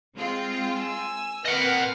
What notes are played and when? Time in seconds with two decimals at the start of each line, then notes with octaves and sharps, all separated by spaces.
0.15 G#3 C4 F4
0.78 G#5 E6
1.46 C4 A#4 B4 D#5 F#5 F6